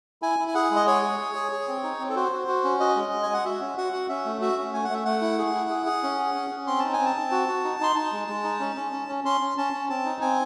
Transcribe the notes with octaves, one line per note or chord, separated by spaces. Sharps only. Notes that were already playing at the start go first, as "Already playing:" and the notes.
E4 G#5
E4
G#5
G#4 F#5
G#3
D#5
G#4 C#5
G#4
G#4
G#4
G#4
C4
D#4
C4
A4
F#4 C5
F#4
F#4
C#4
F#4 D#5
G#3
G#3
G#5
G#3 F#5
F#4 E5
C#4
F#4 F#5
F#4
C#4 E5
A3
F#4 E5
C#4
A3 G#5
F#5
A3 E5
A3 F#5
E4
G#4
E4
G#4
G#4
C#4
G#4
C#4
C#4
C4 C6
D#4 A5
G#5
C4
A5
C4
F#4
F#4
D#4
D#4 C6
D#4 A5
G#3
G#3
D#4
C#4
C#4
C#4
C#4
C#4 C6
C#4
C#4 A5
C#4
C4 A5
D#4
C4 G#5